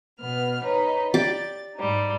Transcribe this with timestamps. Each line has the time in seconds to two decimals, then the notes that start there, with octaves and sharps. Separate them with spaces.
0.19 B2 B3 F6
0.64 D#4 B4 C#5
1.14 G4 D5 A6
1.76 G#2 G3 D#4